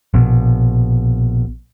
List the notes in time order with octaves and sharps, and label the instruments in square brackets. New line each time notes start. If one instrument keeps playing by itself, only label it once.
[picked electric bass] A#1 B2